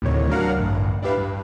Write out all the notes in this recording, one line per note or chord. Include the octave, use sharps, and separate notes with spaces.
D2 A2 C3 D#3 C#5
F#3 D4 A#4 F5 F#5
A1 D2 G2
D4 E4 G4 B4 F5
G2